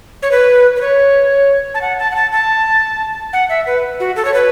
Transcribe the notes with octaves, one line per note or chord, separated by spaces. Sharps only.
C#5
B4
B4
C#5
A5
F#5
A5
F#5
A5
A5
F#5
E5
B4
F#4
A4
C#5
B4